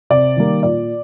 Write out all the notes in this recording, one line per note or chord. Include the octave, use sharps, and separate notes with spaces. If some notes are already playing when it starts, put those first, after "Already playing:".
C3 D5
D#3 G3 A#3
A#2 D5